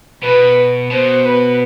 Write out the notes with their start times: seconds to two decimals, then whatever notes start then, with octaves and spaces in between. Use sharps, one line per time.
0.23 B2 B4
0.91 B2 C5
1.25 B4